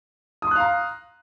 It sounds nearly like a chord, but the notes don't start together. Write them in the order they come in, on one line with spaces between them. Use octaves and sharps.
D#6 C6 F#6 F5 A#5